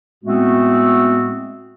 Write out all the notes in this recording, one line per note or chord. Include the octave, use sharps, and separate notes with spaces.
A2 G#3 A3 B3 C4 F#4